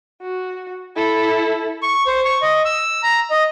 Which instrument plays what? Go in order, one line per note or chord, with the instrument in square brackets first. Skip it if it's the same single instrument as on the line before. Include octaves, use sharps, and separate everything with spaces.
[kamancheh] F#4
E4 A4
[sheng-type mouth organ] C#6
C5
C#6
D#5
E6
A#5
D#5